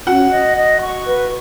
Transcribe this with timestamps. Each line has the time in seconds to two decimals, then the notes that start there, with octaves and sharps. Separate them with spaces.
0.07 C#4 F#4 F#5
0.32 D#5
0.57 D#5
0.81 C#6
1.06 B4